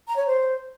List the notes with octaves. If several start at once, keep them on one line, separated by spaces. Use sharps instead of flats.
A#5
C#5
C5